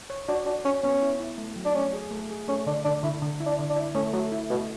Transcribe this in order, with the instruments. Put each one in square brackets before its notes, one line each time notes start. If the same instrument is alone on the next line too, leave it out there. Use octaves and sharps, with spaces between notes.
[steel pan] C#5
[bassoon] D4 [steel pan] F#4
[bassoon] D4 [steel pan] F#4
[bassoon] C#4 [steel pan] C#5
[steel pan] B3 [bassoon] C#4
[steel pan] E4
E4
A3
F#3
[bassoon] D4
[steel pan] A3 [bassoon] C#4
[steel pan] G#4
A3
G#4
[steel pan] A3 [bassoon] C#4
[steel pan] D3 [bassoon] D4
[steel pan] D3 [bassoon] D4
[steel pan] D3 [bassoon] E4
[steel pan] D3
E4
[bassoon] D4
[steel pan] D3
[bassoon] D4
[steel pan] E4
[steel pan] A3 [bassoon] C#4
[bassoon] F#3 [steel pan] A3
[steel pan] E4
[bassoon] B2 [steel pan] A3